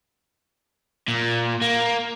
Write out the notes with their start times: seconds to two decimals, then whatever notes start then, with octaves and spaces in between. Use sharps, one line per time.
1.08 A#2
1.61 A#3